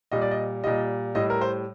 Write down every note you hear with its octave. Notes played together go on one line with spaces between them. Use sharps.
A#2 G3 D#5
D5
D#5
A#2 G3 D#5
A2 G3 D#5
A#4
C5